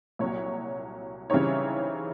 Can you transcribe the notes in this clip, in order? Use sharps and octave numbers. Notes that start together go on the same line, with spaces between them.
C2 A#2 F#3 C#5
C#3 E3 G3 C4 D#4 C#5